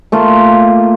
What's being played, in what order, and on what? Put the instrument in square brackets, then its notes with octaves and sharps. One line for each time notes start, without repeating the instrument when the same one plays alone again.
[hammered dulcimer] A3 A#3 F4